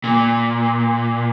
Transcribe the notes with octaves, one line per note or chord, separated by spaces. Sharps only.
A#2